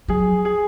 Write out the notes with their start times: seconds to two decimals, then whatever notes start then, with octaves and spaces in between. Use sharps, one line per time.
0.08 F#3 G#4
0.45 G#4